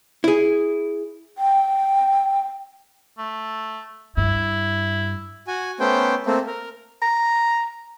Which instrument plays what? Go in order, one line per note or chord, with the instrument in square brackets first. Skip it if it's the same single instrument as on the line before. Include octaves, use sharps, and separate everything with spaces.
[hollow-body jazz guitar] E4 G#4
[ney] G5
[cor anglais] A3
[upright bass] G2 [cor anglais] E4
[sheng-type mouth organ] F#4 G#5
A3 B3 C#4 C5 G5
A3 A#3 C4
A#4
[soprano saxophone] A#5